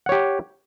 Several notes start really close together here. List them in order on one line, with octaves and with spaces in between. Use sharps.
F#5 C#5 G4